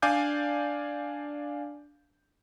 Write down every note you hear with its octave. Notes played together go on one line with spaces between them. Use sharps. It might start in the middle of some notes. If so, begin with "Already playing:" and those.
D4 D5 F5 G#5 D6 G6